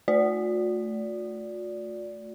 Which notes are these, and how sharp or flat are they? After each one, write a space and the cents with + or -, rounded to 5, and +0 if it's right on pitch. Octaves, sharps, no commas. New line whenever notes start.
A3 +0 F#4 -45 D5 -15